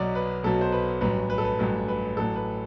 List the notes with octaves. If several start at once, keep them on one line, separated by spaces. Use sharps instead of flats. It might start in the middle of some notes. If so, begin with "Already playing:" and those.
Already playing: B1 B2 F#3 D5
B4
B1 B2 F#3 A4
C5
B4
A1 G2 F#3 B4
B4
A4
B4
A1 G2 F#3 A4
B4
A1 A2 F#3 A4
B4